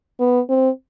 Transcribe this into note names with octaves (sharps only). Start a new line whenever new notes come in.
B3
C4